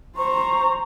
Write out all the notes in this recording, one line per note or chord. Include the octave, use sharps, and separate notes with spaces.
C5 A#5 C#6